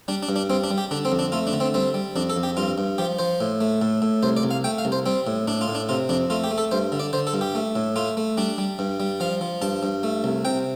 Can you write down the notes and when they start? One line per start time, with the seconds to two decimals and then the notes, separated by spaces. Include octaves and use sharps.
0.08 G3 D4
0.23 D4
0.29 G2
0.36 D4
0.50 G3 C4
0.64 D4
0.70 G3
0.78 G4
0.91 D3 D4
1.05 C4
1.12 F2
1.19 D4
1.32 A3 F4
1.47 D4
1.53 D3
1.60 C4
1.74 G3 C4
1.94 G3
2.16 F2 D4
2.30 A4
2.36 F2
2.43 G4
2.57 G2 F4
2.78 G2
2.98 F3 G4
3.19 F3 C5
3.41 A2
3.61 A3
3.82 A2
4.02 A2
4.23 C2 C5
4.37 D5
4.43 C2
4.51 F5
4.64 A3 G5
4.78 F5
4.85 C2
4.92 C5
5.06 G3 C4
5.27 A2
5.47 A2 D4
5.61 F4
5.68 A2
5.75 D4
5.89 C3 F4
6.09 F2 D4
6.30 A3 F4
6.44 G4
6.51 A3
6.58 A4
6.71 G2 C5
6.92 D3
7.00 D5
7.13 D3 C5
7.27 A4
7.34 G2
7.41 G4
7.55 A3
7.76 A2
7.96 A3 F4
8.17 A3
8.37 G3 D4
8.58 G3
8.79 G2
9.00 G3
9.20 F3 F5
9.41 F3
9.62 G2 A5
9.83 G2
10.03 A3
10.24 C2
10.45 C3 G5